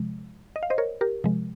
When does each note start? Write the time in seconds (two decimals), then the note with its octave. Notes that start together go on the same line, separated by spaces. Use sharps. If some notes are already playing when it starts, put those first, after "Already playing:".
Already playing: C3 F3 G#3
0.56 D#5
0.63 F5
0.70 C5 D#5
0.78 A#4 C#5
1.01 G4 A#4
1.24 C3 F3 G#3